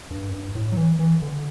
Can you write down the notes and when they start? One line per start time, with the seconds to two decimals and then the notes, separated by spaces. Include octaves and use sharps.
0.11 G2
0.29 F#2
0.33 G2
0.55 A2
0.72 F#3
0.77 E3
0.99 E3
1.22 D3